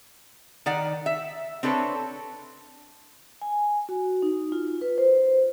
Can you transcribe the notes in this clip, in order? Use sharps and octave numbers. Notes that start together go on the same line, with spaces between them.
D#3 D5 F#5
E5
C4 D4 A4 B4 C#5
G#5
F#4
D#4
F4
B4
C5